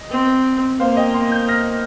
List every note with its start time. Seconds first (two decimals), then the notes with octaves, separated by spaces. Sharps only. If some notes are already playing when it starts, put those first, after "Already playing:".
Already playing: D#5
0.11 C4
0.79 A#3 C5 F5
0.96 D#5 G5
1.14 G5 C6
1.31 D#6 G6
1.48 F6 A#6